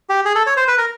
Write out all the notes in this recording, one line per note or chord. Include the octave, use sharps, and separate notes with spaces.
G4
G#4
A4
C#5
C5
B4
A#4